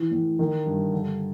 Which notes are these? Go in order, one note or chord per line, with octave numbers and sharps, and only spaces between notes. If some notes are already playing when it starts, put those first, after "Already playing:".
Already playing: E3
A2
D#3
G2
D3